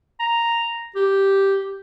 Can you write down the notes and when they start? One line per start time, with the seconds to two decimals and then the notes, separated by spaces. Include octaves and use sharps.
0.20 A#5
0.96 G4